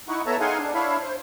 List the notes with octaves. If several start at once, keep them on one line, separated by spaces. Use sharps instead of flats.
D#4 E4 F#5 C#6
B3 A4 C#5 E5 A5 A#5
D#4 G#4 F5 F#5 G#5 C6
D4
D4 E4 C#5 E5 F5 B5
C5